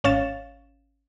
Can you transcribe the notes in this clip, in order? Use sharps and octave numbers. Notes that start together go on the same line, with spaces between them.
G#1 C#4 C#5 F5 A6 E7